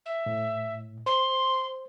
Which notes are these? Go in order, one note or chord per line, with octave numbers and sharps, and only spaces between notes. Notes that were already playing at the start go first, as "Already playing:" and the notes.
E5
A2
C5 C6